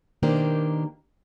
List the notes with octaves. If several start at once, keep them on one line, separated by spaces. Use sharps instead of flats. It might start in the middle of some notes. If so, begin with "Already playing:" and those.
B2 D#3 A#3 D4 G4 C5